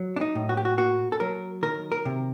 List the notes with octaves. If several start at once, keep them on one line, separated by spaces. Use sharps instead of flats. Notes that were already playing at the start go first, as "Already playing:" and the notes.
Already playing: F#3
D4
D#4
A2
F#4
G4
F#4
A#3 F#4
A4
F#3 A#4
D#3 A#4
A#4
C3